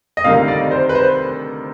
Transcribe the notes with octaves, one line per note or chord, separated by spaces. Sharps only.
D#5
D2 C3 D#3 G3 F5
D5
C5
B4
C5